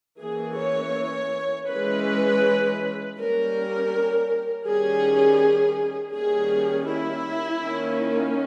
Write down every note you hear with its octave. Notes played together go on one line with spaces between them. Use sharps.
E3 A#3 C#4 G#4
C#5
E3 G#3 C#4 B4
G3 A#3 C#4 A#4
D#3 G3 C#4 G#4
D#3 G3 A#3 C#4 G#4
E4
D#3 A#3 C#4